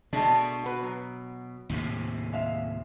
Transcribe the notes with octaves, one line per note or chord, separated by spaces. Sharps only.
B2 G#3 A3 D4
F#4 B4
F#3
D#2 A2 C3
G#3 E5 F5